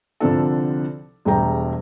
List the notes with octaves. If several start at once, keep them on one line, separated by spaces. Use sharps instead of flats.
C2 D3 F3 C4 D4 A4
E1 G3 A3 G#4 G5 A#5